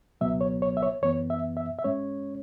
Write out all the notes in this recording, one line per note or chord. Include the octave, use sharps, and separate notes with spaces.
C#2 B2 F#3 B3 E5
C#5
C#5
E5
C#5
F#2 E3 B3 C#5
E5
E5
E5
G#2 G#3 C#4 C#5